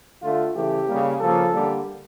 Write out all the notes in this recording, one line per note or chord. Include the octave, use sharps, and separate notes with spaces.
D3 A3 F4
C#3 E3 A3 G4
C#3 G3 A#3
C#3 F3 A#3 A4
D3 G3 A#3